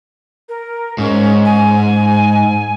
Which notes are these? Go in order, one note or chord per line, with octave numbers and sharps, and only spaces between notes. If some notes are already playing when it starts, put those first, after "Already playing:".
A#4
G#2 C#4
G#5